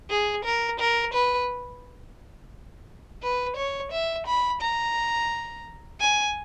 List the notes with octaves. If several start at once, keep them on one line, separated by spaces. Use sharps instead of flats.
G#4
A#4
A#4
B4
B4
C#5
E5
B5
A#5
G#5